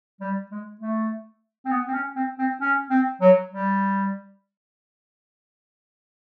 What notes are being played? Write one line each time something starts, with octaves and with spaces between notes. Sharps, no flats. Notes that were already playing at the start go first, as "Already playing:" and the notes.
G3
G#3
A3
C4
B3
C4
C#4
C4
C4
C#4
C4
F#3
G3